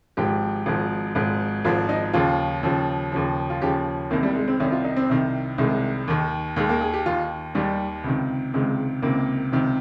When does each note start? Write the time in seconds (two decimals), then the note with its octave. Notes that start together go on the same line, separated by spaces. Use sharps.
0.17 G#1 G#2 F3 G4
0.66 G#1 G#2 F3
1.15 G#1 G#2 F3
1.65 G#1 G#2 F3 F4
1.89 D#4
2.13 D#2 C#3 F3 F4
2.63 D#2 C#3 F3
3.12 D#2 C#3 F3
3.50 F4
3.61 D#2 C#3 F3 G4
4.10 C2 C3 D#3 A#3
4.23 G3
4.35 G#3
4.48 C4
4.60 C2 C3 D#3 C#4
4.72 F4
4.84 D#4
4.97 C4
5.09 C2 C3 D#3
5.58 C2 C3 D#3 G#3
6.08 D#2 D#3
6.56 D#2 D#3 G#3
6.69 A#3
6.81 G#4
6.94 G4
7.06 D#2 D#3 F4
7.55 D#2 D#3 G3
8.04 C#2 C3 D#3
8.54 C#2 C3 D#3 G#3
9.02 C#2 C3 D#3 A#3
9.52 C#2 C3 D#3